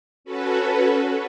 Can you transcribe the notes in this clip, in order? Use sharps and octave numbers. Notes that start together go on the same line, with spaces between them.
C#4 F#4 A4 B4